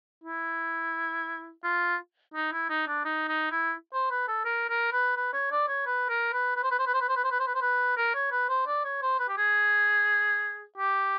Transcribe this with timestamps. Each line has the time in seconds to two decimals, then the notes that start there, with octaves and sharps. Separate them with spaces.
0.24 E4
1.64 F4
2.34 D#4
2.53 E4
2.70 D#4
2.88 D4
3.05 D#4
3.29 D#4
3.52 E4
3.94 C5
4.11 B4
4.28 A4
4.45 A#4
4.70 A#4
4.93 B4
5.17 B4
5.33 C#5
5.52 D5
5.68 C#5
5.86 B4
6.09 A#4
6.33 B4
6.57 B4
6.63 C5
6.71 B4
6.79 C5
6.87 B4
6.94 C5
7.01 B4
7.09 C5
7.16 B4
7.24 C5
7.32 B4
7.40 C5
7.47 B4
7.55 C5
7.62 B4
7.97 A#4
8.15 C#5
8.32 B4
8.49 C5
8.67 D5
8.85 C#5
9.02 C5
9.20 B4
9.29 G4
9.38 G#4
10.78 G4